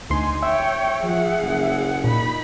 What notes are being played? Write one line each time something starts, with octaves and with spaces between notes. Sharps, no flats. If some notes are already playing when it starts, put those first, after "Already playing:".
D2 D#4 G#5 C6
C#5 E5 G5
F3 G#4 F#5
F#1
A#2 D#4 B5